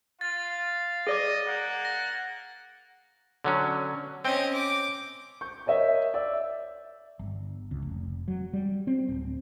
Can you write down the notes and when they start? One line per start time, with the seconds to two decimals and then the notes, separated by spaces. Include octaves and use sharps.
0.21 F4 F5 A6
1.07 G#4 D5 D#5 D6
1.47 A#3 F#5
1.85 A#6
3.44 D3 F#3 C#4
4.25 C4 C#4 D#5 G5
4.54 D6
5.41 C#6 G6
5.66 A#4 C#5 D#5 E5
6.14 D5 E5 E6
7.19 G1
7.71 C#2
7.82 F1
8.28 F#3
8.53 G3
8.87 C4
9.09 D1